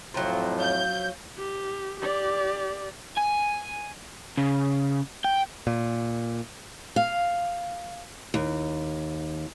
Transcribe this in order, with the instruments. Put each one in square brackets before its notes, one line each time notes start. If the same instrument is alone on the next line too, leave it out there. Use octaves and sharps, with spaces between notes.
[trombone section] F2 A2 [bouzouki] F3 F#3 [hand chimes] G5 A#5 C6
[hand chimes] C#5 F5 [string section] G6
[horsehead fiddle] G4
G4 D5
[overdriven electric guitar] G#5
C#3
G5
[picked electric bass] A#2
[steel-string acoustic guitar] F5
D#2